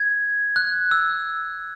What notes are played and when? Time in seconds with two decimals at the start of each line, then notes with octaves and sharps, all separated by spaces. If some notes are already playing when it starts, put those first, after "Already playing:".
Already playing: G#6
0.56 F#6
0.91 E6